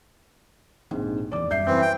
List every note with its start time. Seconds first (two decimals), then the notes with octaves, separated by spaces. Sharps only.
0.91 A#1 G#2 C3
1.32 E2 E3 D5 D6
1.51 F#2 G3 E5 G6 C7
1.67 E3 C4 B4 C5 G6
1.82 G5